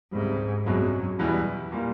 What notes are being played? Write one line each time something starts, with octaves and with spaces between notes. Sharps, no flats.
C#2 G#2 C3 D#3 G3
C2 F#2 B2 G#3
E2 B2 G3 B3 E4
A#2 G3 A#3